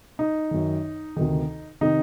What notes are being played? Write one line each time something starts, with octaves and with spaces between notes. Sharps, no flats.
D#4
F#2 D#3
D2 C3 D#3
C3 D#3 D#4